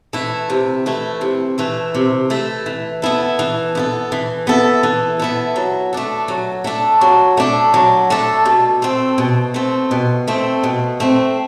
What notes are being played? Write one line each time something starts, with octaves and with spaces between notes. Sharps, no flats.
E3 A3 E4
C3
E3 A3 E4
C3
E3 A3 E4
C3
E3 A3 E4
E3
B3 E4 A4
E3
B3 E4 A4
E3
B3 E4 A4
E3
B3 E4 A4
F#3
A3 D4 A4
F#3
A3 D4 A4
F#3
A3 D4 A4
F#3
A3 D4 A4
B2
A3 C4
B2
A3 C4
B2
A3 C4
B2
A3 C4